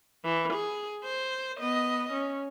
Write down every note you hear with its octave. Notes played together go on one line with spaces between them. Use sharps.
E3
G#4
C5
B3 D#5
C#4